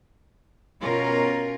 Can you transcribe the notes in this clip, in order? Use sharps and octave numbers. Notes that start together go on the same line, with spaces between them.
B2 C#4 F4 A#4